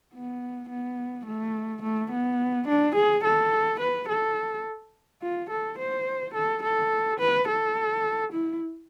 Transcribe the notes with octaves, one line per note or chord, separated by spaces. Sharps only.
B3
B3
A3
A3
B3
D4
G#4
A4
B4
A4
F4
A4
C5
A4
A4
B4
A4
E4